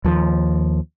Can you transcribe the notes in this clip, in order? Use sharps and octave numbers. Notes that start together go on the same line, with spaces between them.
D#2 F3